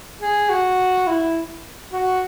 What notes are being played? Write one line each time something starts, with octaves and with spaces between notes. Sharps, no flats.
G#4
F#4
E4
F#4